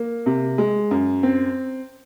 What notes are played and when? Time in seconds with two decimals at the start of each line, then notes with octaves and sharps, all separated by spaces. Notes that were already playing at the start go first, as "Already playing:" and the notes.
Already playing: A#3
0.26 C3
0.58 G#3
0.91 F#2
1.23 C4